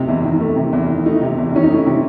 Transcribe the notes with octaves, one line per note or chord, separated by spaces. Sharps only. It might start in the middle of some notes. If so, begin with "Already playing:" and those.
Already playing: C3 A3 C4 D#4
E2
D#3
A3
C3
E2
D#3
A3 D#4
C3
E2
D#3 C#4
D#4
A3 E4
C3